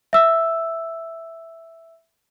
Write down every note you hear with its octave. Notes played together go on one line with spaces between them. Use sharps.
E5 E6